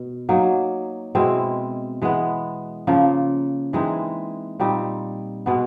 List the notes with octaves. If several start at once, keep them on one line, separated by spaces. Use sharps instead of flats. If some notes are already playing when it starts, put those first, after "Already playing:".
Already playing: B2
F#3 A#3 D#4
B2 G#3 C4 E4
E3 G#3 B3
C#3 F3 A#3
E3 G#3 C4 D#4
A#2 G3 C4 D#4
B2 G#3 B3